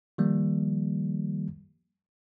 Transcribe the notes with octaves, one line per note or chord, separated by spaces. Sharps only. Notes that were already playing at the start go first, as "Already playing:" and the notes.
D#3 F3 G3 A#3